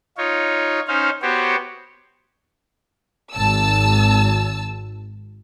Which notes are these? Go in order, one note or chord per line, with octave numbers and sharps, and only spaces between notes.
D#4 F4 C#5
C#4 D#4 C5 F5
B3 F#4 G4 C5 C#5
G#1 A5 E6